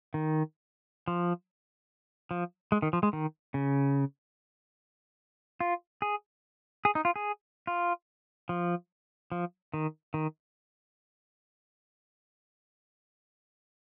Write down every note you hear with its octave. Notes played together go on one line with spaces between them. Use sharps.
D#3
F3
F3
G#3
D#3
F3
G#3
D#3
C#3
F4
G#4
G#4
D#4
F4
G#4
F4
F3
F3
D#3
D#3